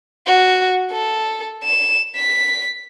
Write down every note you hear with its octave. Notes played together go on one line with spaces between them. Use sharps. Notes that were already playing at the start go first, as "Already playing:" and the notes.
F#4
A4
E7
B6